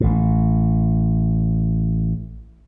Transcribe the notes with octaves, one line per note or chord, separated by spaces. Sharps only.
A1 A2